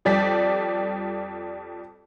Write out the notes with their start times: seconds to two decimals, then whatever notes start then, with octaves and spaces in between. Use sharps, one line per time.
0.05 F2 G3 D5 B6